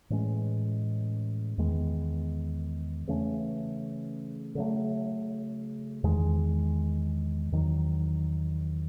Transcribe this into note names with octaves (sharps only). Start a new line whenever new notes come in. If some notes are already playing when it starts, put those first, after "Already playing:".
A2 E3 G#3 C#4
E2 D#3 G#3 B3
C#3 E3 A3 C#4
C#3 F#3 A3
E2 D#3 G#3
E2 D#3 F#3